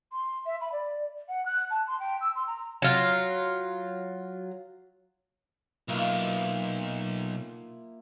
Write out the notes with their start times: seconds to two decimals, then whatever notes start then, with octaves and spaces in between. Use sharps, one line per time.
0.12 C6
0.46 E5
0.61 B5
0.72 D5
1.29 F#5
1.45 F#6
1.70 A5
1.87 C6
1.99 G5
2.21 E6
2.35 C6
2.47 A#5
2.82 F#3 F4
5.88 B1 A#3 E4 F4